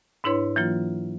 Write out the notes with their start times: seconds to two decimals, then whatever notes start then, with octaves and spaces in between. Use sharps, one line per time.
0.24 G#2 D4 E4 B4 C#5 C6
0.56 E3 F#3 A#3 F4